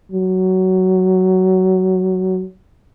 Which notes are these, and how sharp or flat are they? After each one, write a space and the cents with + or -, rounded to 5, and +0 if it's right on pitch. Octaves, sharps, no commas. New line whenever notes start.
F#3 +15